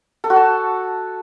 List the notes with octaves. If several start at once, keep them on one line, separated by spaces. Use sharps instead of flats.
A4
F#4
A5